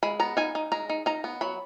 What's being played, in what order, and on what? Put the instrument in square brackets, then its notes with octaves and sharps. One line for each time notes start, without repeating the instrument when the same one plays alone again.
[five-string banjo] G#3 B5
B3 A#5
D#4 G#5
D#4
G#3 A#5
D#4
D#4 A#5
B3
F#3 B5